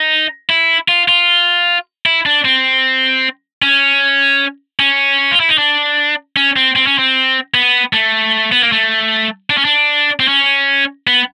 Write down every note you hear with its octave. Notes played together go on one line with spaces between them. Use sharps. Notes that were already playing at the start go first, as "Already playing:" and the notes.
Already playing: D#4
E4
F4
F4
E4
D4
C4
C#4
C#4
F4
E4
D#4
D4
C#4
C4
C4
C#4
C4
B3
A3
B3
A#3
A3
D4
C#4
D4
C4
C#4
B3